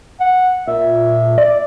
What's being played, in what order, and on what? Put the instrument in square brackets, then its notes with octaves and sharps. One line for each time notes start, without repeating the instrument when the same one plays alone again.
[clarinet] F#5
[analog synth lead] A#2 [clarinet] E5
[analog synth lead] D5